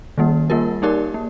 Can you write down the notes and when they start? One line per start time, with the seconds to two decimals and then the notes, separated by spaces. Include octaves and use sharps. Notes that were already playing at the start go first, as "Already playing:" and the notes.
0.18 D#3 G3 A#3
0.50 G3 A#3 F4 A#4
0.82 A#3 D#4 G4 A#4 D5
1.14 A#3